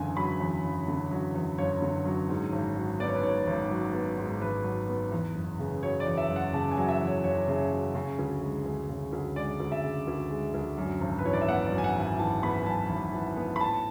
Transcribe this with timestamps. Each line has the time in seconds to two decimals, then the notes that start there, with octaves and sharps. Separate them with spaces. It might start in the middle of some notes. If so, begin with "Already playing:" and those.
Already playing: F#1 E2 D3 G#5
0.17 F#3 B5
0.40 E2
0.64 F#1
0.88 D3
1.11 F#3
1.35 E2
1.58 F#1 C#5
1.82 D3
2.05 F#3
2.29 G#2
2.52 G#1
2.76 F#3
3.00 B3 D5
3.08 C#5
3.15 B4
3.23 G#2 C#5
3.47 G#1
3.71 F#3
3.94 B3
4.18 G#2
4.41 G#1 B4
4.64 F#3
4.88 B3
5.12 E2
5.35 F#1
5.59 C#3
5.83 F#3 C#5
6.00 D5
6.06 E2
6.17 E5
6.30 F#1
6.36 F#5
6.53 C#3 A5
6.71 G#5
6.77 F#3
6.89 E5
7.00 E2
7.07 C#5
7.24 F#1 C#5
7.48 C#3
7.71 F#3
7.95 C#3
8.19 D2
8.42 G#3
8.65 D2
8.89 C#3
9.13 D2
9.36 G#3 D5
9.60 D2
9.72 E5
9.84 C#3
10.07 D2
10.31 G#3
10.54 D2
10.78 F#2
11.01 G#1
11.18 B4
11.25 E3 C#5
11.33 D5
11.41 E5
11.49 B3 F#5
11.66 D5
11.72 F#2
11.78 G#5
11.84 F#5
11.95 G#1
12.01 G#5
12.19 E3 A5
12.43 B3 B5
12.62 G#5
12.66 F#2 A5
12.90 G#1
13.13 E3
13.37 B3
13.56 B5
13.60 A2 A5